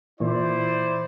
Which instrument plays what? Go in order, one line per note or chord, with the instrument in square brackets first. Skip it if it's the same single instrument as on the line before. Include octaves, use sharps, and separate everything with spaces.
[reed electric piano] A#2 E3 [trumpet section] E4 C5 D5